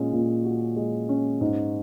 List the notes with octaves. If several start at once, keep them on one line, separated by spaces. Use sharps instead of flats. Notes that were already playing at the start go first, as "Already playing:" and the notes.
Already playing: A#2 G#3 C#4
A#2
F#4
G#3
C#4
G#2